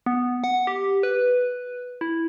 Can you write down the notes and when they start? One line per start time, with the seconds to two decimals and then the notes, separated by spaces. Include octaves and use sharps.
0.06 B3
0.44 F#5
0.67 G4
1.03 B4
2.01 E4